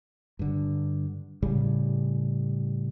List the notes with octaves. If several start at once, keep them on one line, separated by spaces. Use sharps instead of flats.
G2 D3
A2 C#3 G3